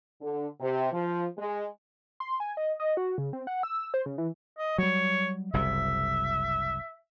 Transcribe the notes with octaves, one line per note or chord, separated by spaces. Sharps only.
D3
C3
F3
G#3
C6
G#5
D#5
D#5
F#4
C#3
C4
F#5
E6
C5
C#3
E3
D#5
F#3 G3 C#5
F#1 C2 C3 E5